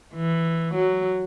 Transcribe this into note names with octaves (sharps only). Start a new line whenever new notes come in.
E3
F#3